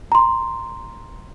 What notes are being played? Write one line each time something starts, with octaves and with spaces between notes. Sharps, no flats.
A#5 C6